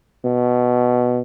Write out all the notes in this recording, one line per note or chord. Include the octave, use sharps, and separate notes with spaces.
B2